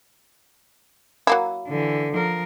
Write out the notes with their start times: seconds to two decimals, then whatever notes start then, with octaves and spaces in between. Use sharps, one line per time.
1.27 F#3 A#3 E4
1.68 D3 E3
2.12 F3 A#4